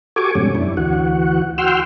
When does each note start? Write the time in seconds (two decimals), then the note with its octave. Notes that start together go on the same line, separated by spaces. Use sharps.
0.16 F#4 G4 A4 G#5 C#6 D6
0.35 F2 G#2 B2 G3 C#4
0.55 F#2 D4 E4
0.77 D2 E3 F#4 F#5
1.58 F#4 F#5 G5 C6 E6 F6